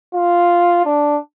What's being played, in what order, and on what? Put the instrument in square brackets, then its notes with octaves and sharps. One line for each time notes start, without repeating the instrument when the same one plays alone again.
[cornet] F4
D4